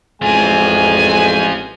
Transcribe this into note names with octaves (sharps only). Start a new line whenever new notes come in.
A1 F2 G#3 C4 F4 G#5